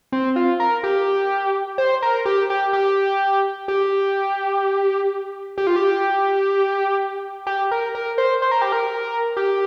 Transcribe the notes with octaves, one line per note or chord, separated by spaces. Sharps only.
C4
F4
A#4
G4
C5
A#4
G4
G4
G4
G4
G4
F4
G4
G4
A#4
A#4
C5
C5
A#4
G4
A#4
G4